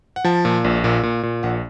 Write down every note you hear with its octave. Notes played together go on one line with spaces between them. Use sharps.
F#5
F3 A5
A#2
A#1
A#2
A#2
A#2
A#1 F#5